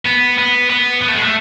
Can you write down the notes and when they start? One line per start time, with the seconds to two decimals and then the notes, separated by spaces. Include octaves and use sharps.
0.06 B3
0.39 B3
0.70 B3
1.01 B3
1.08 A3
1.16 G#3
1.23 A3